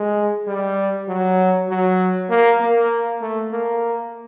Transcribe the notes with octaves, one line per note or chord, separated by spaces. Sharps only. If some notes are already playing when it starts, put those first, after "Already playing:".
Already playing: G#3
G3
F#3
F#3
A#3
A#3
A3
A#3